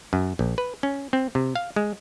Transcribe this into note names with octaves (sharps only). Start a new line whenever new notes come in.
F#2
A#1
B4
C#4
C4
C3
F5
G#3